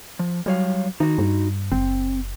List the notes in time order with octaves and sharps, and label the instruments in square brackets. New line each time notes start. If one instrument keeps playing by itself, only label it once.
[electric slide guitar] F3
[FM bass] F#3 [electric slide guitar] G3 C#5 F5
[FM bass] D#3 [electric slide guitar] D#4 F#4
[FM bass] G2
[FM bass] F#1 [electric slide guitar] C4